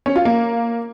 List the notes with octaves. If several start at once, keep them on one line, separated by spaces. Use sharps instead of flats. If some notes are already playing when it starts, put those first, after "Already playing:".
C#4
F4
A#3